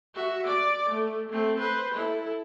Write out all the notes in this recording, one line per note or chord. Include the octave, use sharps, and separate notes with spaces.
F#4 E5
D5 D6
A3
A3 C4
B4 C5
E4 A4